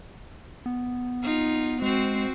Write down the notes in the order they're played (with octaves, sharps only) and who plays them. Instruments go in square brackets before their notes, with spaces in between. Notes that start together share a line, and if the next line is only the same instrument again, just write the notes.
[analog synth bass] B3
[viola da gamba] D#4 F4
[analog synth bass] G#3 [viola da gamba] C4 F#4 C5